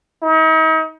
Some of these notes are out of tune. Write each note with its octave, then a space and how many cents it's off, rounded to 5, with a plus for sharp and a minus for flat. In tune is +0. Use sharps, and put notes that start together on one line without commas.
D#4 +40